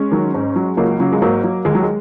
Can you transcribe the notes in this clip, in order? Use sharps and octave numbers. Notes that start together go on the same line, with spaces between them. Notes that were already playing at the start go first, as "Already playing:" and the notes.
Already playing: G#3 C#4
D#3 F#3
G#2
F#3
C#2 F#3 A#3
C#3 F#3
G#3
G#2 F#3 A#3
F#3
D#2 G#3
F#3
G#3